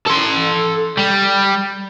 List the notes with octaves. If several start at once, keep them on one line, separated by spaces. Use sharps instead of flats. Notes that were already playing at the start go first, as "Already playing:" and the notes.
A4 C6
G3